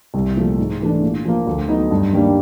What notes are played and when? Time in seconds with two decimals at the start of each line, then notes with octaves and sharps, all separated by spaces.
0.14 C2
0.36 A#2 F3 A3
0.59 G#2
0.80 E3 A3 D4
1.02 A#2
1.25 F3 A#3
1.47 D2
1.68 D3 F#3 B3 D#4
1.91 G2
2.13 D#3 G3 A#3 D4